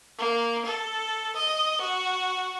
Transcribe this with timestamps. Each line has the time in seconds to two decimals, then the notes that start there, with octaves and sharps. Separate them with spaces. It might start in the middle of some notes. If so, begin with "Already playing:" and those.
0.18 A#3
0.65 A4
1.36 D#5
1.81 F#4